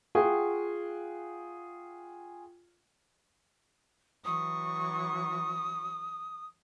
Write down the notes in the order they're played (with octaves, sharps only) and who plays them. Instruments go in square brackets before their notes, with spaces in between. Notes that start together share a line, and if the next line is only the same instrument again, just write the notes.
[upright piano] F4 G#4 F#5 G5 C#6
[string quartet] E3 F#3 C#6 [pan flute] D#6